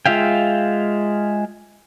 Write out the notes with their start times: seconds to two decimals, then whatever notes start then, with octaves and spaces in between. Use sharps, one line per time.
0.06 G#3 F4 E5 F5 G5